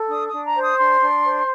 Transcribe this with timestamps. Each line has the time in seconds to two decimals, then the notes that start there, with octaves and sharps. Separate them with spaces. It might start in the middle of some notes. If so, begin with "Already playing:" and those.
Already playing: A4
0.09 D4 D#6
0.27 D#6
0.33 D4
0.44 A#5
0.55 C5
0.61 D#6
0.78 D4 C6
1.01 D4
1.24 C5